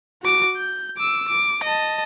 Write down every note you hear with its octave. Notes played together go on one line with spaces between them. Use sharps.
F#4 D6
G6
D6 E6
D6
D#5 A5